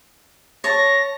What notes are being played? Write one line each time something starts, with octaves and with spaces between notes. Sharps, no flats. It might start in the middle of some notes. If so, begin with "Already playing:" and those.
C#5 A5 A#6